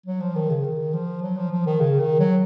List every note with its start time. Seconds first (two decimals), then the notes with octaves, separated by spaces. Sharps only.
0.06 F#3
0.20 F3
0.36 D#3
0.50 C#3
0.64 D#3
0.93 F3
1.22 F#3
1.37 F3
1.51 F3
1.66 D#3
1.80 C#3
2.00 D#3
2.19 F#3